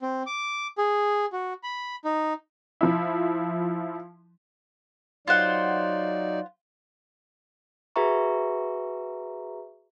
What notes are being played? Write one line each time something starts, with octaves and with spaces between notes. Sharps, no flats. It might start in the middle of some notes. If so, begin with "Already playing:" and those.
C4
D6
G#4
F#4
B5
D#4
F3 E4
F#3 D#4 F4 C5 D5 F#5
F#4 G#4 B4 E5 A#5 C#6